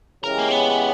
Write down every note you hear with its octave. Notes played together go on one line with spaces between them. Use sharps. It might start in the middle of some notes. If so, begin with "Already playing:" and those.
C#3 E3 G#3 C#4 G4 A#4
A#3
B3